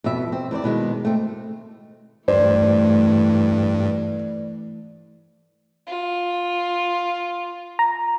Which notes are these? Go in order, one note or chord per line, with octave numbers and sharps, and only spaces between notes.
F2 B2 E5
C4
E2 C4 C5 D5
B2 D#3 G#3
A3 C4
G2 E3 A3 C5 D5
F4
A#5